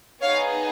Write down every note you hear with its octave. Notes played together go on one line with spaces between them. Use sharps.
B3 D#4 G#4 C#5 F5